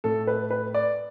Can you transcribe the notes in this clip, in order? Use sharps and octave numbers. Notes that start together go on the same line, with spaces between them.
A2 A3 A4
B4
B4
D5